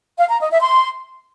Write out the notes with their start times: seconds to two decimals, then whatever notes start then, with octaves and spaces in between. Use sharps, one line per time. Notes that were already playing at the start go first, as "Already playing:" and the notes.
0.18 F5
0.29 A#5
0.40 D#5
0.51 E5
0.62 C6